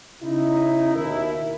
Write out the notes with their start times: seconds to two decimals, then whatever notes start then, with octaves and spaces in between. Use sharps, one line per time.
0.22 C#3 D#4 E4
0.94 D#2 B2 E4 A#4